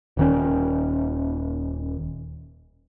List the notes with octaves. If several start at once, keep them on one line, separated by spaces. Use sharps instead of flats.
D#1 D#3 C#4